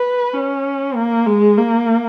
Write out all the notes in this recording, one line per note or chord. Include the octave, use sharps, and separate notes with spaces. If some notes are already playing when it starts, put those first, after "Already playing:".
Already playing: B4
C#4
A#3
G#3
A#3